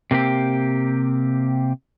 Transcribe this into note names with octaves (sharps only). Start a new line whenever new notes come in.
C3 A#3 C4 G4